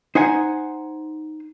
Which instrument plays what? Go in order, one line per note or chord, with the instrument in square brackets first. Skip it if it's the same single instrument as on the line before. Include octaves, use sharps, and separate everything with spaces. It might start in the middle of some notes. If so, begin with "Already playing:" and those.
[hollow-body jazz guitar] D#4 C5 F#5 G#5